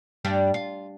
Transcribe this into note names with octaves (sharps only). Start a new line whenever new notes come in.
G2 G3 D4
F4